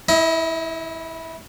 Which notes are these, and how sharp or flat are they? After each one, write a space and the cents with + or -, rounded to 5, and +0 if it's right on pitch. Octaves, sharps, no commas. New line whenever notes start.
E4 -15 D#5 +30